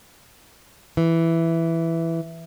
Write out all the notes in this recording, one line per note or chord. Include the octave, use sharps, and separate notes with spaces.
E3